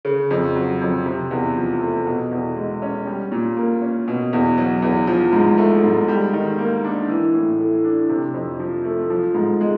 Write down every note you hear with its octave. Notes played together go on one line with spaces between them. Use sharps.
C#3
F2
F#3
F2
C3
E2
F3
A3
B2
E2
G#3
C#4
G3
A#2
A#3
C#4
B2
E2
F#3
E2
F3
G#2
A3
G#2
G3
D#3
A#3
D4
E3
A2
A3
D4
C3
F2
F3
A3
F3
G#2
G#3